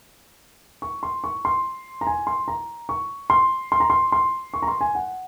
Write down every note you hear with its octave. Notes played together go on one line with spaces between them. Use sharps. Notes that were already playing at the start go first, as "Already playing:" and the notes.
C#6
C6
C#6
C6
A#5
G#5
C6
A#5
C#6
C6
C6
A#5
C6
C6
C#6
A#5
C6
G#5
F#5